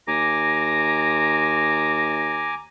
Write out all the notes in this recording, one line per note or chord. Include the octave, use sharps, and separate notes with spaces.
D#2 G#5 A#5 D6 A#6